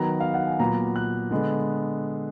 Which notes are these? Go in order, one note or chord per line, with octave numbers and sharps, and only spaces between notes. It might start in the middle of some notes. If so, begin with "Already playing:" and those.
Already playing: D#3 F#3 B3 A#5
F5
F#5
G#5
A#2 F#3 B3 A#5
F#6
D3 G#3 B3